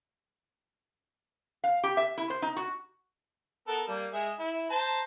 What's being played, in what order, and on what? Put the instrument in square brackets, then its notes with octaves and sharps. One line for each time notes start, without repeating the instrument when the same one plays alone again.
[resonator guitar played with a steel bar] F5
G4
E5
E4
C5
D#4
F#4
[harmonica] B3 A4 A#4
G3 A#3
G#3 G#4 E5
E4
C5 A5 A#5